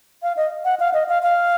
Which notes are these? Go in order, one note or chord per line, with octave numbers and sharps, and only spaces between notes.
F5
D#5
F#5
F5
D#5
F5
F5